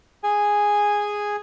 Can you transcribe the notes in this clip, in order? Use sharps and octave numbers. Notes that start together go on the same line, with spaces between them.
G#4 G#5